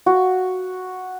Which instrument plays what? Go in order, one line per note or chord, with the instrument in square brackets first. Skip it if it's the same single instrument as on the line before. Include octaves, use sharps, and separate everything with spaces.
[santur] F#4